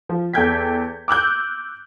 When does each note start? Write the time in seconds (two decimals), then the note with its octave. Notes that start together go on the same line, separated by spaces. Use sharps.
0.09 F3
0.33 E2 A4 G5 G6 G#6 B6
1.08 D6 E6 F#6 G6